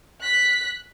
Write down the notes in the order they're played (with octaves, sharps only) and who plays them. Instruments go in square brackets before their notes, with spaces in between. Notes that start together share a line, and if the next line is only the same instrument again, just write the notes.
[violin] F#6 B6